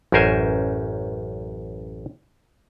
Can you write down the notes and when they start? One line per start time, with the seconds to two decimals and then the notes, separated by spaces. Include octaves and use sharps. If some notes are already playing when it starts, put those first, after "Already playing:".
0.12 A1 F#2 C#4 A#4 C5 G#5